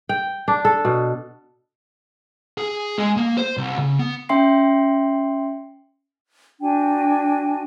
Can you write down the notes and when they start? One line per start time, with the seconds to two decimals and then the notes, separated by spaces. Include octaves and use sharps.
0.09 G5
0.48 D4
0.65 A4
0.85 B2
2.58 G#4
2.98 G#3
3.17 A#3
3.38 C5
3.57 C2
3.78 C#3
3.99 B3
4.29 C#4 E5 G5 C6 C7
6.61 D4 F#4 G5 G#5